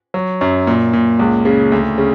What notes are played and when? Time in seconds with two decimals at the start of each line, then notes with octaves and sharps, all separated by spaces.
0.14 F#3
0.41 F#2
0.67 A#2
0.93 A#2
1.19 C#2
1.45 C#3
1.72 D2
1.98 C#3